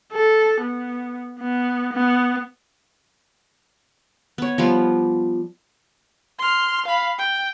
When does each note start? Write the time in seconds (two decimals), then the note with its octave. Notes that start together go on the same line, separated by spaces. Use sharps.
0.13 A4
0.62 B3
1.40 B3
1.93 B3
4.38 B3 C#5
4.58 F3 G3 B3 F4
6.38 C6 F6
6.86 F5 B5
7.18 G5